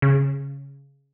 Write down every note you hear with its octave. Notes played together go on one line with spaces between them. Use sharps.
C#3